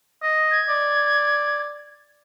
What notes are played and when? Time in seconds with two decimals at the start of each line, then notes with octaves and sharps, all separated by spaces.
0.22 D#5
0.51 G#6
0.68 D5